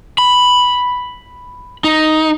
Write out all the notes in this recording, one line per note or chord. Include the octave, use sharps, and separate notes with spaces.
B5
D#4